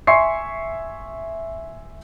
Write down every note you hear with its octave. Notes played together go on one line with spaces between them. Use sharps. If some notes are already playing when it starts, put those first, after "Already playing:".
E5 G#5 C6 C#6 C7